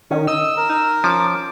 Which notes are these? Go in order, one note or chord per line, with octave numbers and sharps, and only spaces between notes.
D#3 C#4
D#5 E6
A#4
D#4
F3 C#4 D6